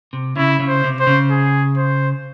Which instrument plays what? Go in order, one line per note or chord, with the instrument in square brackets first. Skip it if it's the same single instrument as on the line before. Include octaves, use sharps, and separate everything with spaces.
[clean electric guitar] C3
[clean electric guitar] C#3 [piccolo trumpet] E4
[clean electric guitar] C#3
[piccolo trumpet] C5
[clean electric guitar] C3
[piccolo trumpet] C5
[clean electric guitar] C#3
[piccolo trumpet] G#4
C5